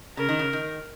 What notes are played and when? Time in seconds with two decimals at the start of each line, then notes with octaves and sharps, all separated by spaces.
0.17 C#3 A#4
0.29 D#3
0.39 C#3
0.53 D#3